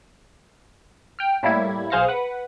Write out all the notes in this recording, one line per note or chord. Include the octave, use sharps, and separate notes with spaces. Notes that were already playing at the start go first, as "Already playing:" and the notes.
G5 F6
A2 G3 A#3 E4 G#6
B1 G#4 C5 F5 A#6 C#7
B4 F#5